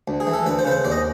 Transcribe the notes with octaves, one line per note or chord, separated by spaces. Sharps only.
D2
G#4
E3
A4
D2 B4
C5
C#3 B4
C5
D#2 D5
D#5